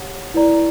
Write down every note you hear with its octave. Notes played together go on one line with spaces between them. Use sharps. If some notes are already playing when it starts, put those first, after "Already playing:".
Already playing: G4 C#5 F#5
E4 B4 D5 A#5